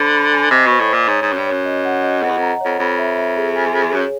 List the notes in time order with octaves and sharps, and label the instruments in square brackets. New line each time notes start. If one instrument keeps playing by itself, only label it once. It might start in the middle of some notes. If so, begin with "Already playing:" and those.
Already playing: [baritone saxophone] D3 [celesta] C5 B5
[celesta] B5
G#5
[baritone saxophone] C3 [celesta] D#5
[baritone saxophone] B2 [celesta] C5
[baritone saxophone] A2
[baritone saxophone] A#2 [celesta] C5
[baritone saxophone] G#2 [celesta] C#5
[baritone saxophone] G#2
[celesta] C#5
[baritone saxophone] F#2
G2
[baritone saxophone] F#2 [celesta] C#5
[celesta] D#5
F#5
D#5
[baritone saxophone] F2 [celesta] F#5
[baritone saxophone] E2
[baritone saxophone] F2 [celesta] A#5
[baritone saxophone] F2 [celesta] C#5
[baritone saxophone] F2 [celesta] B5
[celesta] E5
E5
G#4
G#5
G#4
[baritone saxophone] F#2 [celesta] C#5